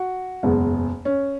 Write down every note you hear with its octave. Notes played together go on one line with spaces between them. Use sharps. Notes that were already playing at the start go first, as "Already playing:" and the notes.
Already playing: F#4
F#1 E2 B2 G#3
C#4